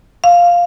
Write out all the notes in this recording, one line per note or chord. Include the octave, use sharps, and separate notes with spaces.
F5